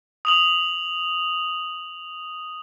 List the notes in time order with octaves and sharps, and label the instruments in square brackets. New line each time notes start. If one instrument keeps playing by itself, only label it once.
[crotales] D#6 F7 F#7